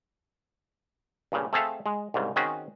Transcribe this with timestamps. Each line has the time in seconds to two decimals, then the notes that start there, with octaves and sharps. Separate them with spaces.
1.32 G2 A#2 C#3
1.53 A3 C4 G#4 A4 E5 F5
1.86 G#3
2.14 C2 G#2 C#3
2.36 D#3 C4 C#4 F#4 G#4